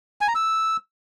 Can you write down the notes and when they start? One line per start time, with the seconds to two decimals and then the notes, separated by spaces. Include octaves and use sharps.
0.21 G#5
0.28 A#5
0.35 E6